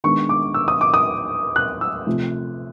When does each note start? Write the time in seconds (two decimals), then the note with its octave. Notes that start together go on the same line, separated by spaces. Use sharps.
0.04 D#3 G#3 B3 D4 C#6
0.29 D6
0.54 E6
0.68 D#6
0.81 D6
0.94 D#6
1.56 F#6
1.81 E6
2.07 C3 F3 A3